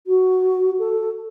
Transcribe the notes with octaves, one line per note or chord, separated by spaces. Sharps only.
F#4
A4